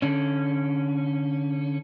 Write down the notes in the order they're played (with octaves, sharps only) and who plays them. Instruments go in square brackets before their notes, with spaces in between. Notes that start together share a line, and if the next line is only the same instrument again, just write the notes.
[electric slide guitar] D3 C#4